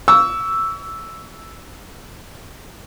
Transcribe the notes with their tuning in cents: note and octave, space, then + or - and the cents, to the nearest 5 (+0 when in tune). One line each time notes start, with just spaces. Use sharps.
C#6 +35 E6 +0